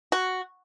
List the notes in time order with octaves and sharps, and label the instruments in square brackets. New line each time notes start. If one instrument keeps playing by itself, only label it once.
[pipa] F#4